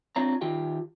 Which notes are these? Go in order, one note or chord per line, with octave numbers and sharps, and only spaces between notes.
C4 D4 F4 C#5 A#5
D#3 F4 G4 G5